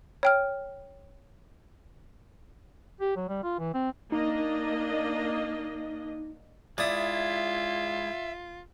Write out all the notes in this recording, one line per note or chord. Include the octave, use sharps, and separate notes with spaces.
C#5 G5 F6
G4
F#3
G3
F4
E3
C4
A#3 D4 D#4 D#5
G#3 E4 F4 D5 E5 D#6